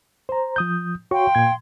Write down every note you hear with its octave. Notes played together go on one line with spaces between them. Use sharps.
C5 A#5
F3 D#6 G6
F#4 C#5 F5 G5 C6 C#6
A#2 G#6